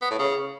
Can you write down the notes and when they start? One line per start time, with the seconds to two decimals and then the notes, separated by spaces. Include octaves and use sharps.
0.02 B3
0.11 A2
0.19 C#3